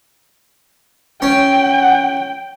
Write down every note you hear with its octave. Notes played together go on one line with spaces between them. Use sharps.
C#4 G5